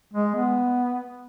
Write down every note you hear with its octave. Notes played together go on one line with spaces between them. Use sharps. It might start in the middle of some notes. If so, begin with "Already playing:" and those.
G#3
B3